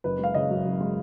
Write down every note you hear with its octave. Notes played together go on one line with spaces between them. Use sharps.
F#1 B4
G#3 F5
C#3 D#5
F#2
F#1
G#3